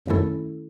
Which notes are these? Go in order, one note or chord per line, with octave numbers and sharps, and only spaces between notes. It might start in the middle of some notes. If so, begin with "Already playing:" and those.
F#2 D#3 A3 C#4 E4 A4